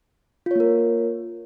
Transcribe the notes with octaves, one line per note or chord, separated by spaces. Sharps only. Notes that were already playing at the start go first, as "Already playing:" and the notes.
A#3 F4 A#4 C#5